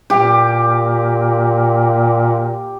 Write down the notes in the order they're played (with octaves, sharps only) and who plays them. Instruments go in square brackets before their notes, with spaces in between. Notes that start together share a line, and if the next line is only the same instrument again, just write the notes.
[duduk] A#2 [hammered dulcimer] G4